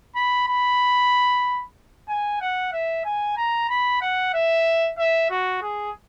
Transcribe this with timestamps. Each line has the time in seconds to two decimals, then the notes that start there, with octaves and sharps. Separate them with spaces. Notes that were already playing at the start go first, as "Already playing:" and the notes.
0.15 B5
0.48 B5
2.08 G#5
2.40 F#5
2.73 E5
3.04 G#5
3.37 A#5
3.69 B5
4.01 F#5
4.34 E5
4.98 E5
5.30 F#4
5.62 G#4